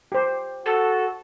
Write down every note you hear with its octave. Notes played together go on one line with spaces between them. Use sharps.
G4 C5
F#4 A4